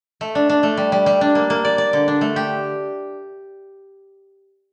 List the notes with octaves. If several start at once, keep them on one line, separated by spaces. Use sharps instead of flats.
A3
D4
D4
A3
G3
G3
G3
D4
A#3
A#3
D5
D5
D3
D4
A3
G4